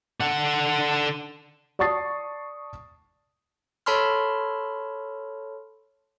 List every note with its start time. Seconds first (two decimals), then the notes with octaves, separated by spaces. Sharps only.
0.20 D3 F#5
1.79 D5 A5 C#6 D#6 A6 C7
3.86 A4 C#5 A5 B5 C6 F6